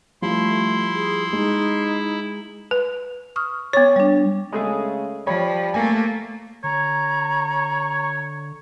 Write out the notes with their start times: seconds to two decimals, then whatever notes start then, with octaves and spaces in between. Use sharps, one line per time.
0.22 F3 G3 A3 E4 C6
0.94 G#4
1.33 G#3 D#4
2.71 B4
3.36 C#6 D#6 F6
3.73 B3 C#5 C#6 D6
3.96 G3 D4
4.52 C#3 G#3 A3 G#4
5.27 F3 G3 C#5 B5
5.74 A3 A#3 G#5
6.64 D3 C#5 A#5